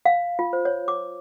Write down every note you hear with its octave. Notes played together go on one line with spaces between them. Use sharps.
F5
F4
C5
C#5
D6